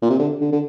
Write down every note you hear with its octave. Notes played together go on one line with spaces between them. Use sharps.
A#2
C3
D3
D3
D3